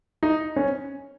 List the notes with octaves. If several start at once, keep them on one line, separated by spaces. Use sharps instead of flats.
D#4
C#4